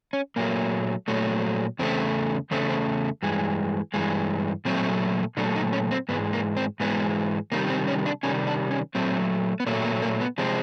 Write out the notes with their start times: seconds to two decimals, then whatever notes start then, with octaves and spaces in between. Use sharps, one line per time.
0.13 C#4
0.36 A#2 F#3 A3 A#3
1.08 A#2 F#3 A3
1.79 E2 C#3 A3 C4
2.51 E2 C#3 A3 C4
2.69 C4
3.23 G2 E3 G#3
3.94 G2 E3 G#3
4.65 A#2 F#3 A3 C4
5.37 A#2 F#3 A3 D4
5.56 D#4
5.73 C#4
5.91 C4
6.09 G#2 E3 G#3 B3
6.33 A#3
6.57 C4
6.80 G#2 E3 G#3 B3
7.52 C3 D#3 G3 A#3
7.70 C4
7.88 C#4
8.06 D4
8.23 C3 D#3 G3 C#4
8.47 D4
8.71 C#4
8.95 A#2 F#3 A3 C4
9.60 B3
9.66 A#2 F#3 A3 A#3
9.84 A#3
10.02 A#3
10.21 B3
10.38 C3 F3 G#3 C4